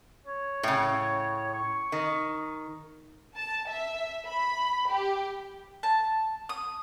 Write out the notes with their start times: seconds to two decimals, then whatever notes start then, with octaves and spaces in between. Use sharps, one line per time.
0.26 C#5
0.63 A2 C#3
1.54 C#6
1.92 D#3
3.35 A5
3.70 E5
4.26 B5
4.88 G4
5.83 A5
6.49 D#6